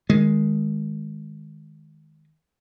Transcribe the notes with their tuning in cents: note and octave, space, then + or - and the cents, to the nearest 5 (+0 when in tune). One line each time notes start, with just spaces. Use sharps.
D#3 +0 G#3 +5